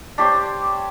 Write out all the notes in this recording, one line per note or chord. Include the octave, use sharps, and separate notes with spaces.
D4 G4 C5 C#5